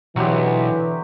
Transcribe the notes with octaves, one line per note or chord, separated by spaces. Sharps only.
B1 E2 D3 E3 F#3 C4 G4